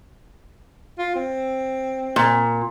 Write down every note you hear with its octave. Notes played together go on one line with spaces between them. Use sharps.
F4
C4
A#2